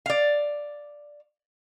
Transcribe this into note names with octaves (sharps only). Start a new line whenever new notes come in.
D5 F5